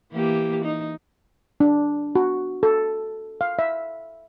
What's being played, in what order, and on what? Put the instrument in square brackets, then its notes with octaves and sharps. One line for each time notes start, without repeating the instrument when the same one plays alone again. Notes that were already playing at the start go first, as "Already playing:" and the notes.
[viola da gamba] E3 A#3 G4
D#4
[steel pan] D4
F#4
A4
F5
E5